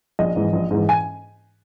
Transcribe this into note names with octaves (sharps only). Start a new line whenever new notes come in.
A#1 D#5
G#2 E3
A#1
G#2 E3
G#5